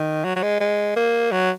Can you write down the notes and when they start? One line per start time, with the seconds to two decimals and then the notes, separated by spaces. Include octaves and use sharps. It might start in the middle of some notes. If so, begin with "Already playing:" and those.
Already playing: D#3
0.24 F#3
0.36 F#3
0.42 G#3
0.60 G#3
0.96 A#3
1.32 F#3